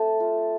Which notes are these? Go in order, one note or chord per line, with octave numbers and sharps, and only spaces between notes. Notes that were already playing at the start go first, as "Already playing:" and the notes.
Already playing: A3 C4 A4
F4